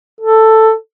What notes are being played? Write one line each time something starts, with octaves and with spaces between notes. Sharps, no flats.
A4